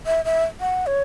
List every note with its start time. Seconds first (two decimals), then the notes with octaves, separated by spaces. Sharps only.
0.06 E5
0.25 E5
0.61 F#5
0.87 C#5